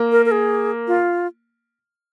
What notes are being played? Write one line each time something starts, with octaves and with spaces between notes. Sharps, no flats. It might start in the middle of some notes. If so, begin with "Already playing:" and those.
Already playing: A#3
A#4
A#4
G#4
F4